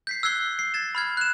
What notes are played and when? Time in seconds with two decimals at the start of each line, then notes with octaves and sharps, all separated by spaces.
0.07 G6 B6 C7
0.23 E6 F#6 G#6 C7 G7
0.59 C7
0.74 G#6 A6 E7
0.95 B5 F6 G#6
1.17 F#6 E7